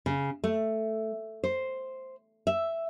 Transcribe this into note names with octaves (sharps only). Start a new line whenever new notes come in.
C#3
A3
C5
E5